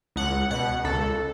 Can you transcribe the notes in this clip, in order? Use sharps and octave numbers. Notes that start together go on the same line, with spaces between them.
C#2 F#5
B2 F#5
C#2 A4